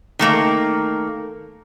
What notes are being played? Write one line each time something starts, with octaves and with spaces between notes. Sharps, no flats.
D#3 A3 A#3